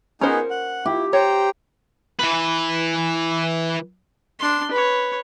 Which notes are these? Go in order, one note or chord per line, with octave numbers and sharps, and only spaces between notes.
B3 C#4 D#4 G#4 A#4 C5 C#6
F#5
E4 G4
C5 C#5 G5 A#5
E3 B4
D4 C6
B4 C#5